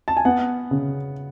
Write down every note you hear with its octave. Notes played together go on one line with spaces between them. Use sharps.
A5
G#5
B3 F#5
C#3